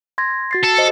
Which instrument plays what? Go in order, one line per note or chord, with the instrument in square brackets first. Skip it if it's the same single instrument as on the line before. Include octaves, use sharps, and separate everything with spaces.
[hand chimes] C6 G#6 A#6
F#4 A6 C7
[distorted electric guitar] A4
[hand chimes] C5 D#5